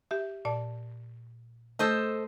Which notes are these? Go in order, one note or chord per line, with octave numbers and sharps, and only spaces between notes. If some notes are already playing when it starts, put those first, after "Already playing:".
G4 E5
A#2 D5 A5
A3 A4 C5 D#5